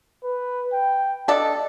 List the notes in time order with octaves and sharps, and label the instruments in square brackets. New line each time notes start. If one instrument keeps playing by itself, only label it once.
[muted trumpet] B4
G5
[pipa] D4 A4 [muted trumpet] D#5